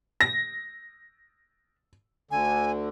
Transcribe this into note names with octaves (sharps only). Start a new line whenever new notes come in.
A#6
D2 D3 G#5